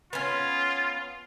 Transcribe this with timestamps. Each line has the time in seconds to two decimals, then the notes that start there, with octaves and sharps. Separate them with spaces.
0.13 B3 C#4 F4